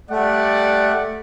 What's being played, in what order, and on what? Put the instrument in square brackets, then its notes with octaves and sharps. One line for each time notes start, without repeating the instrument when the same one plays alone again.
[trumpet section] G3 D5 F#5 [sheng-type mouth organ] A3